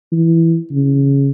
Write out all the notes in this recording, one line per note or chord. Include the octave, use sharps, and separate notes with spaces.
E3
C#3